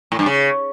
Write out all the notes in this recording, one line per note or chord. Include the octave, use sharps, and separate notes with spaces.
A2
G2
C#3